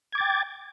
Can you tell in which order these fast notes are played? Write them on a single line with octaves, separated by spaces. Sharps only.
G#6 D6 A6 G5